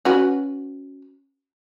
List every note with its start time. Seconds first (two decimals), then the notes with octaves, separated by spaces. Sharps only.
0.05 C#4 F#4 B4